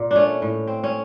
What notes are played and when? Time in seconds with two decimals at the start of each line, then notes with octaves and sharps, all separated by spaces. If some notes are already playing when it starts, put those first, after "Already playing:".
Already playing: A#2
0.11 A3 C#4 D4
0.42 A2
0.67 C4
0.84 C#4